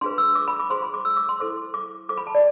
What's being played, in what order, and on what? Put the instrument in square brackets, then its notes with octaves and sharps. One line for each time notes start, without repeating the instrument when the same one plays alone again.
[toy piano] D4 F4 G#4 B4 C6
E6
D6
B5
D6
F4 G#4 C5 C6
B5
D6
E6
D6
C6
E4 A4 C5 D6
D6
F4 A4 C5 D6
B5
A5
D5